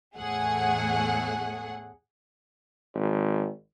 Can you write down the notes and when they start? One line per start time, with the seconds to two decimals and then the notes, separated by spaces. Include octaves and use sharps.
0.16 E2 A2 A3 G#4 F#5
2.95 G#1